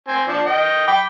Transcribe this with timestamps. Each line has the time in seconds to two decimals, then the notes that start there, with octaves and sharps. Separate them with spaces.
0.08 C4 G#5
0.28 F3 D4
0.46 D#5 G5
0.87 G5 B5 D6